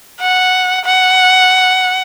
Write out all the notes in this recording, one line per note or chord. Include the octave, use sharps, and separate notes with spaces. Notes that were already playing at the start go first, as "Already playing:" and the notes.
F#5
F#5